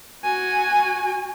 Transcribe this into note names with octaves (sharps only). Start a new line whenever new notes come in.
F#4 G#5